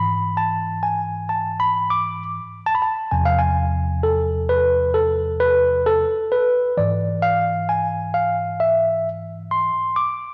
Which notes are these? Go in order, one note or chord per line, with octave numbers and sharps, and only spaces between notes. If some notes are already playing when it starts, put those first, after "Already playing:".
Already playing: G#2 E3 B5
A5
G#5
A5
B5
D6
A5
B5
A5
E2 C3 F3 G#5
F5
G#5
A4
B4
A4
B4
A4
B4
G#2 E3 D5
F5
G#5
F5
E5
C6
D6